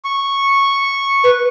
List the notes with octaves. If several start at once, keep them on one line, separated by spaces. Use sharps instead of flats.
C#6
B4